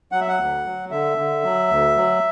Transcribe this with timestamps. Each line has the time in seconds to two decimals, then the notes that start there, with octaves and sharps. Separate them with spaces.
0.12 F#3 F#5
0.21 E5
0.28 F#5
0.39 D2
0.65 F#3
0.91 D3 E5
1.18 D3
1.44 F#3
1.70 D2
1.97 F#3